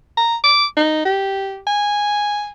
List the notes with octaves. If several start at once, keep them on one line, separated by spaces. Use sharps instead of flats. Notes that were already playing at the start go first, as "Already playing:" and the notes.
A#5
D6
D#4
G4
G#5